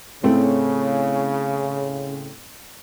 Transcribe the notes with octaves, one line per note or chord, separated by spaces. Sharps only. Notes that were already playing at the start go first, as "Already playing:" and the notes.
A2 C#3 A3 C4